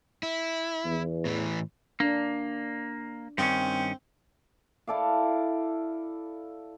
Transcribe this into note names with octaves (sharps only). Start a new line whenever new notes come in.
E4
E2
A2 E3
A#3 D4
G2 D#3 C4 C#4
E4 A4 D5 F5